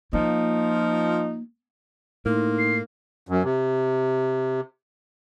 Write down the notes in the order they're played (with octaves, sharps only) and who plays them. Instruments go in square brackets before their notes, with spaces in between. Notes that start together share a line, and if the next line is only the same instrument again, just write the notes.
[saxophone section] F3 D#4 F4 [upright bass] A#3
[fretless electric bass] A2 [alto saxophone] A#3 [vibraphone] D#4 C6
[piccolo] C7
[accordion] F#2
C3